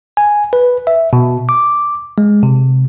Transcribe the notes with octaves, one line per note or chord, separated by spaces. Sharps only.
G#5
B4
E5
B2
D6
G#3
C3